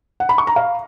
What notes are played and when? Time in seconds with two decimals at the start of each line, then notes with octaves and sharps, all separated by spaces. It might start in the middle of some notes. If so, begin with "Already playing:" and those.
0.20 F#5
0.29 B5
0.38 C#6
0.47 A#5
0.56 F5